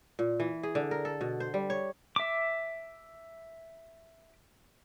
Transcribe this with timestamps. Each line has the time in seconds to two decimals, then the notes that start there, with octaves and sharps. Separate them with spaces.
0.19 A#2
0.40 E3
0.63 G#4
0.75 D3
0.91 A#4
1.05 A4
1.21 B2
1.40 C5
1.54 G3
1.70 C#5
2.16 E5 D6